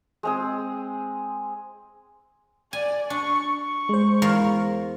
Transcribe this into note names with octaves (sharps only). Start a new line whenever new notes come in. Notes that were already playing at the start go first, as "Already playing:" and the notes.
G#3 C4 G#4
D5 G#5
D4 C#6
C#6
G#3 C5
E2 A#4 F5